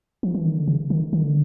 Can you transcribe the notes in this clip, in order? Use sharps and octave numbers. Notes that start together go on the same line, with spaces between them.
F3
E3
D#3
D3
C#3
D#3
D#3
D3